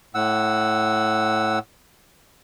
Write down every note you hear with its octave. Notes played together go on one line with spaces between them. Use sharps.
A2 F#5 E6